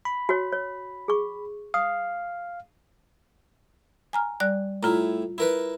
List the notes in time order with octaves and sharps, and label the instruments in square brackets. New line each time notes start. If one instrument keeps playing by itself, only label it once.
[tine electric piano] B5
[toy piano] F#4 C#5
C#5
G#4 C#6
[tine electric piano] F5 [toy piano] D#6
[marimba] G#5 A#5 F6
G3 D5 F#6
[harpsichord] A2 E4 [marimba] F4 A#5
[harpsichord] E4 A#4 B4